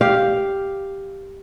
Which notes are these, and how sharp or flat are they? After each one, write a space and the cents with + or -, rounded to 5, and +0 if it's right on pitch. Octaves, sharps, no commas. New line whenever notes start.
G4 +0 F5 +0